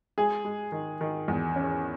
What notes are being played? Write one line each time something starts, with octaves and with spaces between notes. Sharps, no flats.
G#3 G#4
G#3
D#3
D#3
E2
C#4